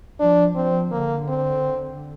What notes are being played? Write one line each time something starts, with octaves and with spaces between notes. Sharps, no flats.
F3 D4
F3 C4
D3 A#3
C4